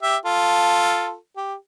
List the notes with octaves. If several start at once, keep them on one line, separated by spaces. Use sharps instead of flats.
G4 E5
F4 A4
G4